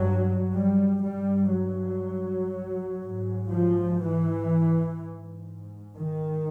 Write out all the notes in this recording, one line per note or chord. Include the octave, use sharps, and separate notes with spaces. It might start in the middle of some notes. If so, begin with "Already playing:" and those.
Already playing: G2 F#3
G3
G2 G3
F#3
G#2
F3
E3
G#2
D#3